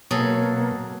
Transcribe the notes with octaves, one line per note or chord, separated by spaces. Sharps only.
B2 F#3 A#3 G#4 A4